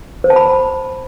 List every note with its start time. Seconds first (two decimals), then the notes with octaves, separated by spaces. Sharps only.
0.24 C5
0.30 A5
0.36 B5